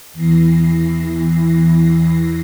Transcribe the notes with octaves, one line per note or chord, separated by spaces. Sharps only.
E2 E3 A#6 C7